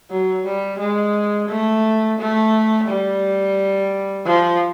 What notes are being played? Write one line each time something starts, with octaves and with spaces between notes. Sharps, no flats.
F#3
G3
G#3
A3
A3
G3
F3